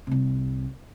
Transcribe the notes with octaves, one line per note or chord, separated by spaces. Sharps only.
C2 C3